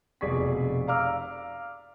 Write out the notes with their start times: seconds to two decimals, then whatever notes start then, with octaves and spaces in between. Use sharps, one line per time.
0.21 F1 B2 G#4 D5 C#6 B6
0.87 D5 F5 A#5 D6 E6 F6